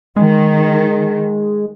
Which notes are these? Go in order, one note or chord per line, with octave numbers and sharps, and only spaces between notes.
D#3 G#3